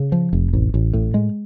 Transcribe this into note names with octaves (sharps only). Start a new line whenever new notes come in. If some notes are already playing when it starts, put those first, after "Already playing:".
Already playing: C#3
F3
F1
A1
A1
A2
G#3